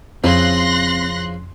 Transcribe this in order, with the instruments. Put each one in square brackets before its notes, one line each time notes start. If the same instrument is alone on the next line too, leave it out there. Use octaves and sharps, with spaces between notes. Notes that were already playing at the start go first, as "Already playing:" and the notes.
[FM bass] F2 [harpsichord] C#3 F3 E4 [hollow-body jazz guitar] C4 [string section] C6 F#6 A#6